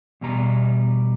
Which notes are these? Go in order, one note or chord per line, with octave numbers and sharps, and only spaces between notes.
E2 B2 G3 A#5